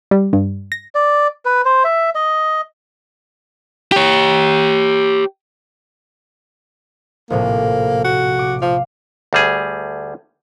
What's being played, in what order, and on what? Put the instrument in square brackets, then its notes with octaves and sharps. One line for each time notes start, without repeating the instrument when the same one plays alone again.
[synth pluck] G3
G2
A#6
[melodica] D5
B4
C5
E5
D#5
[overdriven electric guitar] G4 C#5
[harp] A#1 A2 C3 [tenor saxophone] A#3
[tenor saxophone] F#4
[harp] D6
[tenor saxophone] F3 [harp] F5
[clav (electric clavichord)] D2 G3 G#4